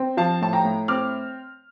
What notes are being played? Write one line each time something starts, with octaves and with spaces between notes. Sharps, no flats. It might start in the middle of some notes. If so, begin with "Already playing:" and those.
Already playing: C4
F3 F5 A5
A2 A5
G5 A#5
A2
C4 D6 F6